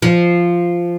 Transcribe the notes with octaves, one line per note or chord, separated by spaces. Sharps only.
F3